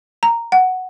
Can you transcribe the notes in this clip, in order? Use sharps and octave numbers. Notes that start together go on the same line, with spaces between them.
A#5
F#5